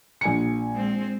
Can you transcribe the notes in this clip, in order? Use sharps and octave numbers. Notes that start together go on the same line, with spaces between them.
A#1 G#5 C#7
G#3 C4